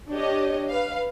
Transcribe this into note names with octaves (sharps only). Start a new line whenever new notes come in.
D4 G4 C#5 D#5
B4 F5